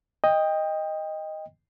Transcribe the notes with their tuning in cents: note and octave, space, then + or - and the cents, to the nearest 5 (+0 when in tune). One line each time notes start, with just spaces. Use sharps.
D#5 +0 G5 +20